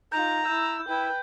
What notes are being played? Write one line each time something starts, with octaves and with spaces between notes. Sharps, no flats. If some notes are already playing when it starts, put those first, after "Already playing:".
D#4 F4 A#5 G6
E4 E6 G6
E4 B4 G5